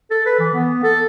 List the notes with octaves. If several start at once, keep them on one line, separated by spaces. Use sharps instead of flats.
A4
B4
E3
B3
A4